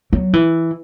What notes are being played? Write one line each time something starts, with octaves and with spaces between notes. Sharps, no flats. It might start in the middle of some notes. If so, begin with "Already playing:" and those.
F#3
E3